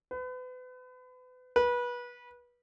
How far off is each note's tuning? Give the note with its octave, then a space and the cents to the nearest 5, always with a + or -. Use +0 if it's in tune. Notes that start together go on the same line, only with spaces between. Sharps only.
B4 +35
B4 -25